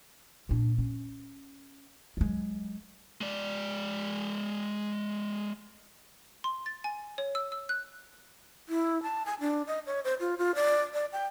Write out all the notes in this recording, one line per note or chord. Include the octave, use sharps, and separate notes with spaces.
A#2 D4
C#4
F#3 G#3
G#3 D5
C6
A6
G#5
C#5
E6
E6
F#6
E4
A5
G#5
D4
D#5
C#5
C5
F4
F4
D5
D5
G5